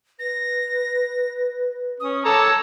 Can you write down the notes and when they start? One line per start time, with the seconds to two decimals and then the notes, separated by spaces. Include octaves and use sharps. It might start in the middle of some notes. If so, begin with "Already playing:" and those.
0.19 B4 A#6
2.00 C#4 D#6
2.25 A4 A#4 C#5 A5 A#5 D6